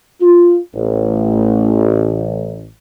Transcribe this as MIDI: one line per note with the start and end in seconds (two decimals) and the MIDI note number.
0.20 0.57 65
0.74 2.64 33